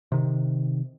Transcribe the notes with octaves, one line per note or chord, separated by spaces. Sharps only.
C3 D#3